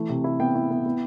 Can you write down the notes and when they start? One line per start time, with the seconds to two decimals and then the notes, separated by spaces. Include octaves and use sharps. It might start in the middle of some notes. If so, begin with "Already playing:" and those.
Already playing: E3 A3
0.09 C3
0.24 E4
0.40 B3 G5
0.55 E4
0.71 B3
0.86 B3